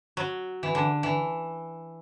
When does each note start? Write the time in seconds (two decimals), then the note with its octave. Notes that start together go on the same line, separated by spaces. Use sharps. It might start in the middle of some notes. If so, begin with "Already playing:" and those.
0.17 F#3
0.63 E3
0.75 D3
1.03 E3